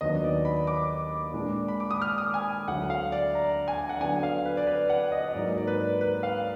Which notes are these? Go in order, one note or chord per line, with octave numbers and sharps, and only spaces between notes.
D#2 D#3 F#3 B3 D4 D#5
D5
B5
D6
A#2 G#3 D4
B5
D6
D#6
F6
D#6
G#5
D2 D3 F#3 F#5
F5
D5
A#5
G#5
F#5
D3 F#3 B3 D4 G#5
F5
B4
D5
B4
F#5
D#5
D#5
G#2 F#3 A#3 D#4 D5
D5
B4
B4
F5